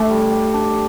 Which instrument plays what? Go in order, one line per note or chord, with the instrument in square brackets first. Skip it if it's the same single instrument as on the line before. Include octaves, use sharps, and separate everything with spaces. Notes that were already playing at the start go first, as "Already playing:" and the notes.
Already playing: [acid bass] A3 [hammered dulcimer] D4 G4
[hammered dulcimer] G3
G4
D4